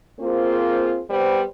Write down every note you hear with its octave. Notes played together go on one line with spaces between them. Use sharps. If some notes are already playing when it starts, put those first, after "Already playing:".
A#3 C4 F4 G#4 C5
G3 B3 C5